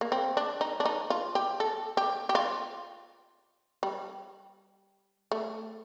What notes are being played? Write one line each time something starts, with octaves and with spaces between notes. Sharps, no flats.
A#3
C4
D4
D#4
D4
D#4
F4
G4
A4
G4
G4
F4
G3
A3